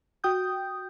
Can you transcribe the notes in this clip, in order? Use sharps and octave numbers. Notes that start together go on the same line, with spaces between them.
F#4 G5 D#6 G6